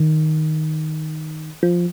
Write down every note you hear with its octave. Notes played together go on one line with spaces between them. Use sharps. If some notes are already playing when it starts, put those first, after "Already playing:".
Already playing: D#3
F3